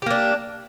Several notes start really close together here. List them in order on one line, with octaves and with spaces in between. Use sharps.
G4 A#3 D4